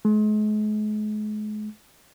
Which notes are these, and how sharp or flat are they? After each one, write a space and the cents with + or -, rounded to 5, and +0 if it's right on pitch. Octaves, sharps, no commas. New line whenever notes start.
G#3 +40